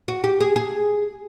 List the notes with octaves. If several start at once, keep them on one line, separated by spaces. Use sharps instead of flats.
F#4
G4
G#4
G#4